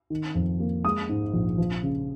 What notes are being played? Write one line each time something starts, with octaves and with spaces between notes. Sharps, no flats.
D#3
F2
A#3
G#3 D#6
G#2
A#1
F3
C#3